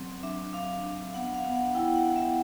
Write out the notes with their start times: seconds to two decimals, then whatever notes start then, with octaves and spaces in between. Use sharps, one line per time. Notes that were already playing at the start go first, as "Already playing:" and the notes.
Already playing: F#3 C4
0.23 D4 E5
0.53 D4 F5
0.85 D4
1.14 B3 F#5
1.35 F5
1.44 B3
1.55 F#5
1.75 E4 G5
1.95 F#5
2.05 B3
2.16 E5